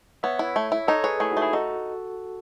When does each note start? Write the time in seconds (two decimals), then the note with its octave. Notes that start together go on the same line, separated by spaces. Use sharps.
0.23 B3 C#5 E5
0.39 E4
0.56 A3
0.72 E4
0.88 D#4 A4 C#5
1.04 G#4 B4 C#5
1.20 A3 E4 G#4
1.31 D#4 F#4
1.37 A3
1.42 E4 G#4
1.53 D#4 F#4 A4